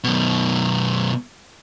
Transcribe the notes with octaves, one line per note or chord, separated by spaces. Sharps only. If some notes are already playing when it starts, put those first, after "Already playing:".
F#2 B2